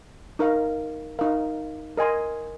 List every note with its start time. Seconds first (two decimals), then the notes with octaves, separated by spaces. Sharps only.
0.39 D#4 A#4 F5
1.19 D#4 A#4 F5
1.97 A#4 D#5 G#5 C6